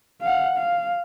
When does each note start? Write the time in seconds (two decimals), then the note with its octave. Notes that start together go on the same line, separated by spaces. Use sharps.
0.21 F5 F#5
0.57 F5